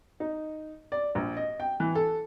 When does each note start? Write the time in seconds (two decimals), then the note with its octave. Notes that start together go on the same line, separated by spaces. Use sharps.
0.20 D#4
0.92 D5
1.15 A#1
1.37 D#5
1.60 G5
1.80 E3
1.95 A4